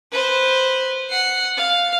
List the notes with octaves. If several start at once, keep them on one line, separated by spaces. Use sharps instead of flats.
B4 C5
F#5 C7
F5